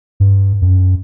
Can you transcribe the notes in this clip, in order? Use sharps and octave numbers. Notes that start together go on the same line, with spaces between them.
G2
F#2